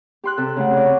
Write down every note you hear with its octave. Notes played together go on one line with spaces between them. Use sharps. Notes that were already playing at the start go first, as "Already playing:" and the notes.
G4 C6 F#6
C3 A4
C#3 A3 F#5
G#4 D5
C#4